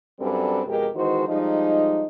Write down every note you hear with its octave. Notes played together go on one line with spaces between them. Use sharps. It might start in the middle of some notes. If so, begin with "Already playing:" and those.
F#2 G3 C4 D4 A4 B4
F2 B2 G#3 G4 A#4
D#3 E3 G#3 D#4 F#4 C5
F3 G3 G#3 D#4